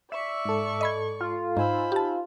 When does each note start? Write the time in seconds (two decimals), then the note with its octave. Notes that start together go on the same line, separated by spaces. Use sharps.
0.12 D5 E5 C#6
0.45 G#2 A4
0.81 D#5 B5 G#6
1.20 F4
1.57 G#2 D#4 C5 G#5 B5 E6
1.92 G4 A5